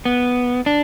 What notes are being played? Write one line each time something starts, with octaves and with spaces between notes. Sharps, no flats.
B3
D4